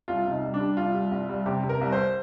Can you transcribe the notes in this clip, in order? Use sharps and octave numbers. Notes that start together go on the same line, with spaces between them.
C2 F4
C3
D#4
G3
D4
G3
C2 F4
G3
C2
G3
C3 G4
C3
A#4
C2
C5